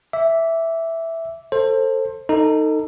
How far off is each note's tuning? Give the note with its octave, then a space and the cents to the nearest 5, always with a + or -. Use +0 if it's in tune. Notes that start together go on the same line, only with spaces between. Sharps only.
E5 +0 D6 -15
A4 +25 C5 +20
D#4 +0 A4 +30